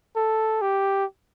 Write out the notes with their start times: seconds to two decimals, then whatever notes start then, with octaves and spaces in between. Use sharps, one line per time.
0.16 A4
0.61 G4